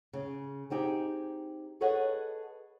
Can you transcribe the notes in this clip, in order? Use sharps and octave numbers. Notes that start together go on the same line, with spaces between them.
C#3
C4 D#4 G4 G#4
G#4 A4 B4 C#5 D#5 F#5